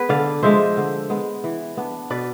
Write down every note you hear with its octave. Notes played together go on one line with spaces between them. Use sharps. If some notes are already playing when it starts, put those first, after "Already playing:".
Already playing: B3 G#4 B4
D3 D5 F5
F3 G#3 C5 E5
D3
G#3 B3
E3
B3 D4
B2 B4 D5